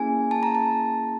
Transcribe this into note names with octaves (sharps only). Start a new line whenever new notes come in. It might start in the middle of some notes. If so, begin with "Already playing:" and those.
Already playing: A#3 C#4 E4 G#4 G#5
A5
A#5
A5